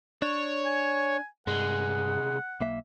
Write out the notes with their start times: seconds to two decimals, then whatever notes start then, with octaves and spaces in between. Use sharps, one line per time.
0.22 D4 C#5
0.66 G#5
1.47 C2 G2 G#3 F#5
2.61 B1 A#3 E5